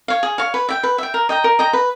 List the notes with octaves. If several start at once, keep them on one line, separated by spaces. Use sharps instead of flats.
C#5 F5
G#4
C#5 F5
B4
E5 G5
B4
E5 G5
A#4
D#5 G5 A#5
A#4
D#5 G5 A#5
B4